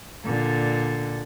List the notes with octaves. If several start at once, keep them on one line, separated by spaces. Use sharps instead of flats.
A#2 D3